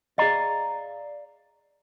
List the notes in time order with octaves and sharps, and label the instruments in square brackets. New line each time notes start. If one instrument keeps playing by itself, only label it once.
[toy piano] G#4 D#5 [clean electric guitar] D5 F5 A#5